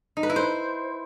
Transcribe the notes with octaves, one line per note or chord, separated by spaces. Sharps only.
D#4
B4
E4
C5